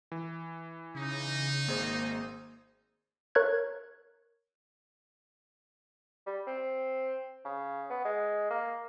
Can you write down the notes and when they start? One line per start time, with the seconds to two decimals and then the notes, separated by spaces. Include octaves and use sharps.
0.12 E3
0.95 C#3 D#4
1.68 G#1 A#3 G#4 C5
3.35 A#4 C#5 F#6 G#6
6.26 G3
6.47 C4
7.45 C#3
7.90 B3
8.05 G#3
8.51 A#3